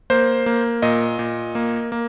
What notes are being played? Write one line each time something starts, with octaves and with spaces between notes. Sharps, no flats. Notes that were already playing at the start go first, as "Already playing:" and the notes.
A#3 C5
A#3
A#2 D#5
A#2
A#3
A#3